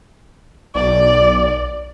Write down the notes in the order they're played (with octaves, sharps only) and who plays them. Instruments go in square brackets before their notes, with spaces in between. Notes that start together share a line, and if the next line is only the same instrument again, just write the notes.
[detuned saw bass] B1 [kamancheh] D5